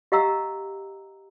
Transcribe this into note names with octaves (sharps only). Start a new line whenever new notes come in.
G4 D#5 F5 F#5 A#5 E6